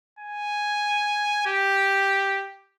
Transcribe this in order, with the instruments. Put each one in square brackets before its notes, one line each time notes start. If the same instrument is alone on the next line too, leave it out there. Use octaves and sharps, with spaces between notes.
[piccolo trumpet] G#5
G4